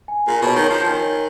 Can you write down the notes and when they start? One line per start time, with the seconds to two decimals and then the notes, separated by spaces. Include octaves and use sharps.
0.08 G#5
0.27 A#2 G#4
0.41 B2 C#5
0.55 D#3
0.64 C#5
0.70 F3
0.84 D#3 G#5
1.02 C#5